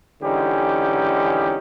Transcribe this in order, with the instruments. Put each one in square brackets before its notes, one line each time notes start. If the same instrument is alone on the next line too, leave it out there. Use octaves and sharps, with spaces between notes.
[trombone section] G#2 D3 E3 C#4 D#4 G4